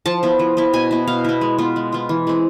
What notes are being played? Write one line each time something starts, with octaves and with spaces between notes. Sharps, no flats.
F3 A5
B3 E4
F3
B3 E4
B2 G#5
B3 E4
B2 F5
B3 E4
G#3
B3 F4
G#3
B3 F4
E3
G#3 C4